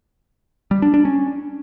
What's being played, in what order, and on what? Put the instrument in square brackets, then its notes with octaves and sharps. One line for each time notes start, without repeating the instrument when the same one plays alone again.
[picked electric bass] G3
D4
D4
C#4